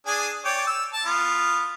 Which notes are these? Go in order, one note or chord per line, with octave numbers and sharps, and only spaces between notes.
D4 G#4 G#5
C#5 D5 G5
E6
A5
B3 F4